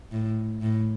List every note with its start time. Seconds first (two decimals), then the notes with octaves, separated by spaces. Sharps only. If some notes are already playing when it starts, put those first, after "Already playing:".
0.12 A2
0.62 A2